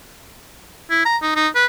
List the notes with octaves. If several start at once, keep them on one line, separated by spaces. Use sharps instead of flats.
E4
A#5
D#4
D#4
B4